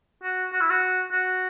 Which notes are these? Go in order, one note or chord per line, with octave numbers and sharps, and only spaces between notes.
F#4
F#4
E4
F#4
F#4